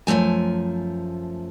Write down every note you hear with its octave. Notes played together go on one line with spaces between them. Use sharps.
F#2 F3 G#3 A3 G#5